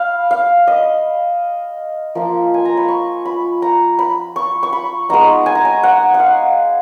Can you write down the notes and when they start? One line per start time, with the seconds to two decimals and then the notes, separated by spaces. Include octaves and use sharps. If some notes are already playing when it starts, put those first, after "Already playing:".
Already playing: F5 B5
0.31 F5
0.67 D#5
2.15 F3 A#3 F4
2.54 G#5
2.65 A#5
2.77 B5
2.88 C#6
3.25 B5
3.62 A#5
3.99 B5
4.36 C#6
4.63 C#6
4.73 B5
5.09 G#3 B3 D#4 A#5
5.46 G#5
5.55 A#5
5.65 G#5
5.83 F#5
6.14 F#5
6.20 F5